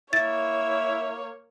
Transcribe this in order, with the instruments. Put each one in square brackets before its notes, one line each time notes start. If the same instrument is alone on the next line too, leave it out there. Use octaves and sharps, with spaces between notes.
[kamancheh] A#3 C#5 [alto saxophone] E4 [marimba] A6